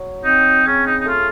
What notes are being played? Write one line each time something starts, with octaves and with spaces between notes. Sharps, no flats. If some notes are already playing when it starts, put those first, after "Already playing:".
Already playing: F#3
C4 D#4
C#3 C#4
D#4
D#4
A3 F4